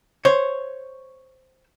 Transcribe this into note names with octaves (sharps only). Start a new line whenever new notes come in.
C5 C#5